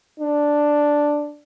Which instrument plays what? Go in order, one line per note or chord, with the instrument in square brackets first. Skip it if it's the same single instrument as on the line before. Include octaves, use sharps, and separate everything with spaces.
[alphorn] D4